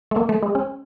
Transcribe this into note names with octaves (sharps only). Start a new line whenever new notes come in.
A3
A#3
A3
G#3
C#4